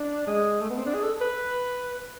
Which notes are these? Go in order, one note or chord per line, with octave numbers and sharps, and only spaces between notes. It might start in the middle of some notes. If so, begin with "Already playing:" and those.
Already playing: D4
G#3
A3
B3
C4
D4
G#4
A4
B4